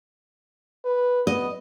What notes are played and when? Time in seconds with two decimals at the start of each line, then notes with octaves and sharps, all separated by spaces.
0.85 B4
1.27 B3 D#5